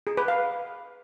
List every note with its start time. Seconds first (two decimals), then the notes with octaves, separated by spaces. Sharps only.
0.07 G#4
0.17 B4
0.28 F5